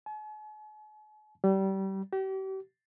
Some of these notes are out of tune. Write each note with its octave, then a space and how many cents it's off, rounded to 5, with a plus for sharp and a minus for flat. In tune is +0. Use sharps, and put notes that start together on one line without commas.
G#5 +45
G3 -25
G4 -40